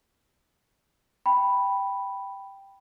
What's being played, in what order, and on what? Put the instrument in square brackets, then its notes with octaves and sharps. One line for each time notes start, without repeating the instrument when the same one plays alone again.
[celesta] G5 B5